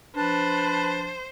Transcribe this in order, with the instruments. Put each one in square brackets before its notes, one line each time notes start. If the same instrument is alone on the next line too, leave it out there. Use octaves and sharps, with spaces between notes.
[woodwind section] F3 D4 [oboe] B4 [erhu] C5 [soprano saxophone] A5